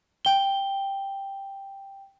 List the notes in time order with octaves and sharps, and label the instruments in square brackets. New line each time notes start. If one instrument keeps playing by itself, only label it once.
[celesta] G5 G7